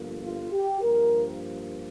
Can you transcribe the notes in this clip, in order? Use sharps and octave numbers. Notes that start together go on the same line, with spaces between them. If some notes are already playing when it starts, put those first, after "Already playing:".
Already playing: G1 G2 F3 A#3
F4
G4
G2 F3 A#3 A#4